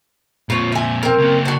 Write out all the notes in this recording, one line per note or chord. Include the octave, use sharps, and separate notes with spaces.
F2 A#2 F4 C#5
E5 G#5
C4 A#4
C#3 A#3
D4 F#4